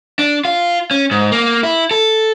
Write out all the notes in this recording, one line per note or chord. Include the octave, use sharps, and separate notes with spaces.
D4
F4
C#4
G#2
A#3
E4
A4